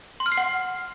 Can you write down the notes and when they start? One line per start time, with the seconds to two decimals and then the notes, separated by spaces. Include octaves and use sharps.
0.20 C6
0.26 F6
0.32 C7
0.37 F#5